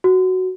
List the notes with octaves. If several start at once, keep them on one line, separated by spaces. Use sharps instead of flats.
F#4